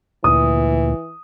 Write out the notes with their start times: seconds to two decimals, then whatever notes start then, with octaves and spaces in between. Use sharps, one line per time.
0.24 D2 A#2 E3 D#6